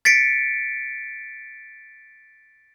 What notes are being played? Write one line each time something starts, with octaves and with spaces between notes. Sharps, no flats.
A6 B6 C#7 D7